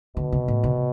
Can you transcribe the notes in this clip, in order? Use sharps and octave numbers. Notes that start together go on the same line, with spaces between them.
B2 D3
C3
A2
C3